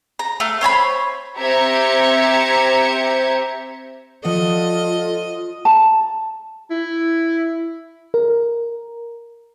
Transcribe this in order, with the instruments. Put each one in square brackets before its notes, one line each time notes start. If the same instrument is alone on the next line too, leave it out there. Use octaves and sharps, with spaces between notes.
[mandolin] A#5
A3 F5
C5 C#5 A5 B5
[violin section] C4 G4 E5 A#5 G#6 C#7
[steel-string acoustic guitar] F3 D5 F#5 [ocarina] F4 [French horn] A4 [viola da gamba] D#5
[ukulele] A5 A#5
[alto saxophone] E4
[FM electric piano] A#4